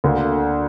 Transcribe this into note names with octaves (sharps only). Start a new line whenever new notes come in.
D2 D3 A#3